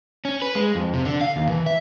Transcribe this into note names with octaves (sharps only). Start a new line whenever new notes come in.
C#4
B4
G#3
F2
C3
D3
F5
D#2
E3
E5